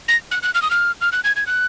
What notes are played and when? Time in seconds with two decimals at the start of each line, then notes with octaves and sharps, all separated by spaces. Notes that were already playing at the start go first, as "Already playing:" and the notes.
0.08 A#6
0.31 F#6
0.43 F#6
0.55 F6
0.62 D#6
0.71 F6
1.01 F6
1.13 F#6
1.24 G#6
1.36 G#6
1.47 F#6